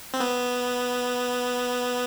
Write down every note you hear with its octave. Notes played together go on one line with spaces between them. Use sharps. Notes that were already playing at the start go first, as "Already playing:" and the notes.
C4
B3